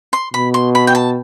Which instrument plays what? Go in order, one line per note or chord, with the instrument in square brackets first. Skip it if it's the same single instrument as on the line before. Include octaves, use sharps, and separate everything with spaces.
[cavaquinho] C6
[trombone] B2 [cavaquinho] B5
[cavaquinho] C6
B5
G5
A5